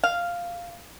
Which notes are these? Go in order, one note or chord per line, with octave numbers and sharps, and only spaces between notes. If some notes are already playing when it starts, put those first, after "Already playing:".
F5